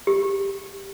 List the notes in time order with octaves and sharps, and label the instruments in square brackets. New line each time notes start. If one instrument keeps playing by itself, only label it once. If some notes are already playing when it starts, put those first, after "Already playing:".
[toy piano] G4